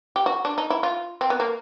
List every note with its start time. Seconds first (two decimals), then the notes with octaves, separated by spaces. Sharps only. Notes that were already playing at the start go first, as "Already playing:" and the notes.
0.16 G4
0.26 F#4
0.45 D4
0.58 D#4
0.70 E4
0.83 F4
1.21 C4
1.30 B3
1.40 A#3